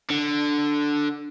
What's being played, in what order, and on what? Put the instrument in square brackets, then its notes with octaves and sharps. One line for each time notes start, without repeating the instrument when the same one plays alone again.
[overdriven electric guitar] D3